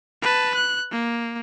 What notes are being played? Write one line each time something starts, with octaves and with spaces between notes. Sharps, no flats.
B4 A5
F#6
A#3